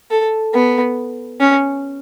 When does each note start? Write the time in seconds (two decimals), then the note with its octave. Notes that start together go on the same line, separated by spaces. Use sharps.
0.11 A4
0.54 B3
1.40 C#4